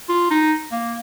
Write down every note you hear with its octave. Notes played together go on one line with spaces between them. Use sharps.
F4
D#4
A#3